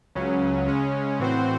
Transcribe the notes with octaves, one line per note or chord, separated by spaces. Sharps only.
C#2 C#3 F#3 C#4
C#3 G#3 C#4
A2 E3 C4 F#4 C5